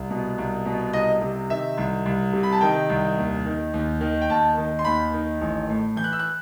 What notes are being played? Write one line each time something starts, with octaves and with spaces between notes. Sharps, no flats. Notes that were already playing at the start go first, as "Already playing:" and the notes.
Already playing: C2
B2
C2
B2
C2 D#5
C3
D#3 E5
C2
C2
C3
B5
A5
D#3 G5
C2
D#2
D#3
D#2
D#3
G5
D#2 A5
D#3
C6
D#2 B5
D#3
A1
A2
E3 G6
F#6
E6
F#6